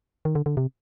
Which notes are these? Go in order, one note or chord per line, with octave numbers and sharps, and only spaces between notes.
D#3
D3
D3
C3